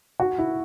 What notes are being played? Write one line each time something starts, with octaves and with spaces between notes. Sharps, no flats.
F#4
E4